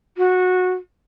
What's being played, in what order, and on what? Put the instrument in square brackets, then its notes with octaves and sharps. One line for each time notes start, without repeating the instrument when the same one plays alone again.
[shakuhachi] F#4